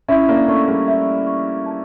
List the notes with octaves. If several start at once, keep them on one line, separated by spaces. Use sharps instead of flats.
C#4 E4 E5
A#3 D4
A3 C#4 C#6
G3 A#3
E5
C#6
A5